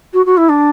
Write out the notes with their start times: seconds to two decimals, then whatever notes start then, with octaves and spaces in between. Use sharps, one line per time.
0.13 F#4
0.26 F#4
0.37 E4
0.49 D4